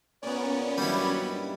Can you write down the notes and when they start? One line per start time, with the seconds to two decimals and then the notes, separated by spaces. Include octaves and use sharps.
0.23 A#2 B3 C#4 G#4 C#5 D5
0.78 G2 D#3 F#3 G3 E4 D#5 D6